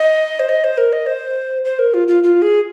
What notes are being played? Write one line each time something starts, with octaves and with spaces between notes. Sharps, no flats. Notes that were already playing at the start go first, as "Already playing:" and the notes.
Already playing: D#5
C5
D#5
C5
A#4
D#5
C5
C5
A#4
F4
F4
F4
G#4